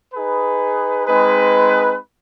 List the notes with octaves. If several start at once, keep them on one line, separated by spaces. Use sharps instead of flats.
D#4 G#4 B4
G#3 C4 D#4 G#4 B4